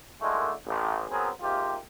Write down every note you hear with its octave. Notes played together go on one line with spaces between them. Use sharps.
A#2 D3 D#3 G#3 A3
A1
F#3 B3 C4 G#4 A#4
G#2 C3 A#3 F4 G4